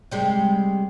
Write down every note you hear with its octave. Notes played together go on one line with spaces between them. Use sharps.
C3 G3 G#3